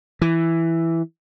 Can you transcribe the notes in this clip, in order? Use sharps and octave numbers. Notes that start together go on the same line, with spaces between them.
E3